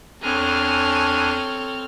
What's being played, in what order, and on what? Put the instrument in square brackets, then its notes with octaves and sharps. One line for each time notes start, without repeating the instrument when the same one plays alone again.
[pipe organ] E2 D4 G#5 [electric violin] C4 F6 [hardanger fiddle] A4 C#5